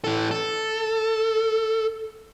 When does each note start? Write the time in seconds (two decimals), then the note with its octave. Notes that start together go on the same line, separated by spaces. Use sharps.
0.04 E3 A4
0.31 A4